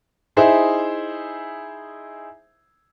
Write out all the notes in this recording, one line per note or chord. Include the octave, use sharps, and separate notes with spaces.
D#4 E4 G#4 C5 E5